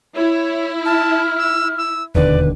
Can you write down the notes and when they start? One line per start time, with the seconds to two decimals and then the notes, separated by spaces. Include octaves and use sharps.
0.15 E4 C#5
0.85 A5 F6
1.38 E6
1.78 E6
2.15 E1 D#2 D3 B4 D5